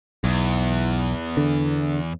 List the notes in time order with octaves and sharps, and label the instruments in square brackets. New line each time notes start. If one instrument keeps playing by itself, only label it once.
[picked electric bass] B1 [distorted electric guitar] E2
[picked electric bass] D3